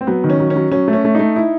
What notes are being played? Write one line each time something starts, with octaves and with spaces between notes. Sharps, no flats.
C4
F#3 B3
D#3
C#4
F#3
C#4
F#3
F#3 C#4
A3
C#4
A3
A3 D#4
E4